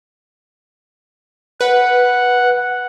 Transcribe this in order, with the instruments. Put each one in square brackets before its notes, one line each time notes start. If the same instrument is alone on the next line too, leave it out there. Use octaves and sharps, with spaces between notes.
[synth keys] B4 [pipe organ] F#5